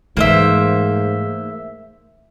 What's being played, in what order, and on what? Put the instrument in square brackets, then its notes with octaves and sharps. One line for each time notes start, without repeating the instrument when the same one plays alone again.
[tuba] G#2 [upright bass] E3 A3 [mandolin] A#3 C5 E5